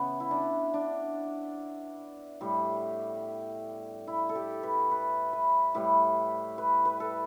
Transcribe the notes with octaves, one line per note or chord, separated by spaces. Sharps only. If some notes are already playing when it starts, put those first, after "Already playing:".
Already playing: C#3 E3 B3
E4
D4
D4
A2 G3
E4
A4
G4
B4
B4
B4
A2 G3 B4
B4
B4
A4